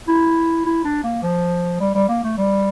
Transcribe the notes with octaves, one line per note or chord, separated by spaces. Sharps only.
E4
E4
D4
A#3
F3
G3
G3
A#3
A3
G3